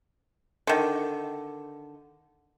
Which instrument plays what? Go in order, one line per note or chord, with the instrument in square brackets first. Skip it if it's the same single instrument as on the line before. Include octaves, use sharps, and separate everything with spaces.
[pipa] D3 D#3